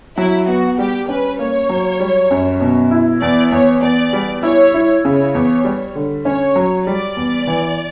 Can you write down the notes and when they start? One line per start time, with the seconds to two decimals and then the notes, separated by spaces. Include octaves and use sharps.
0.17 F#3 E4
0.47 B3 F#4
0.78 G3 G4
1.09 C#4 B4
1.39 A#3 C#5
1.69 F#3
2.00 G3
2.31 F#2
2.61 B2
2.91 E4
3.22 E2 D5
3.52 E2 C#5
3.82 E2 D5
4.13 G3
4.43 E4 C#5
4.74 E4
5.04 C#3 C#5
5.35 E2
5.64 G3
5.95 D3
6.25 C#4 C#5
6.56 F#3
6.87 G3 D5
7.16 E2
7.47 E3